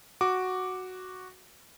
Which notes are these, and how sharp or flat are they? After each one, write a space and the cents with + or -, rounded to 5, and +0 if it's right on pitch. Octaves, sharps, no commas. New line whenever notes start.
F#4 +0 D6 +0